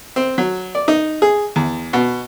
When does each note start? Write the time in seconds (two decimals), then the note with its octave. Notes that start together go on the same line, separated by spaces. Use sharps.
0.16 C4
0.38 F#3
0.75 D5
0.88 D#4
1.22 G#4
1.56 E2
1.93 B2